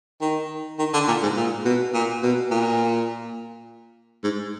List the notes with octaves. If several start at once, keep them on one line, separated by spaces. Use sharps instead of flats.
D#3
D#3
D3
A#2
G#2
A#2
B2
A#2
B2
A#2
G#2